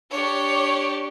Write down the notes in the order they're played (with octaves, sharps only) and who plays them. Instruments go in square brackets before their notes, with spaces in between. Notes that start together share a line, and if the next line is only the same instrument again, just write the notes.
[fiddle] D4 G4 [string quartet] C#5